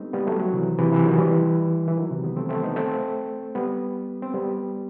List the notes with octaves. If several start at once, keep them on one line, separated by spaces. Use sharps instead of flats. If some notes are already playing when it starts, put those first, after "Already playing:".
Already playing: G3 A3 B3 C4 D#4
G3 B3
F#3 A3
D#3 F#3
C3 E3
C3 E3
C3 E3
D#3 F#3
E3 G3
E3
D#3 F#3
C3 E3
G3 B3
A3 C4
A3 C4
B3 D#4
A3 C4
G3 B3
C4
G3 B3